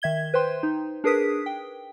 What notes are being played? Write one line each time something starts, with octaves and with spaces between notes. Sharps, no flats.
D#3 E5 G#6 G7
B4 C5 G5 C6
D#4
D4 G#4 A#4 B4 D#6 B6
G5